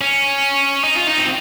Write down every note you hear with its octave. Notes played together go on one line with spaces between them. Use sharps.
C#4
D#4
F4
D#4
C4